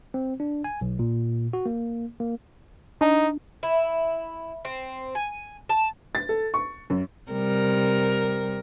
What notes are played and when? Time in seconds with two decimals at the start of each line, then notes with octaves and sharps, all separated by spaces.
0.14 C4
0.40 D4
0.64 G#5
0.81 B1
0.99 A#2
1.53 F#4
1.66 A#3
2.20 A#3
3.01 D4 D#4
3.63 E4
4.65 C4
5.15 G#5
5.69 A5
6.15 A6
6.29 A4
6.54 C#6
6.90 F#2
7.31 C3 G3 A#4